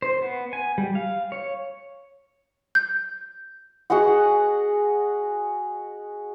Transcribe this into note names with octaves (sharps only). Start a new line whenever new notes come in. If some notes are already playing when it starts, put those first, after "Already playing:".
C5
B3
G#5
G3
F5
C#5
G6
F#4 G#4 D#5 F#5